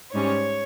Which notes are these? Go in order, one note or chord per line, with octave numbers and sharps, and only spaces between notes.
G#2 G3 C#4 C#5